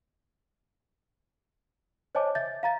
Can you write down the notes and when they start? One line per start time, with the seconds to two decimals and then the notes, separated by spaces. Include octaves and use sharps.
2.15 C5 C#5 D#5 G#5 A5 D6
2.35 E5 G6 A6
2.63 F5 A#5 A6